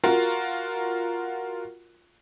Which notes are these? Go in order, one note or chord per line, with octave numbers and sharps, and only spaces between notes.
F4 F#4 A#4